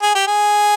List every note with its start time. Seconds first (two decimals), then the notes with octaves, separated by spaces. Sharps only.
0.02 G#4
0.15 G4
0.27 G#4